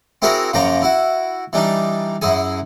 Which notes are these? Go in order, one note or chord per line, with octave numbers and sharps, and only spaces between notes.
C4 E4 F#4 G#4 A#4 B5
F#2 C#3 F3 A#3 G5 A#5
E4 F#4
E3 G3 D4 D#4
F#2 E4 G#4 G#5